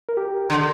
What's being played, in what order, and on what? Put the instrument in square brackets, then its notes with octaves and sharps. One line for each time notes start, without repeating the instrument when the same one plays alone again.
[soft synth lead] A#4
G4
[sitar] D3 [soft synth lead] A#4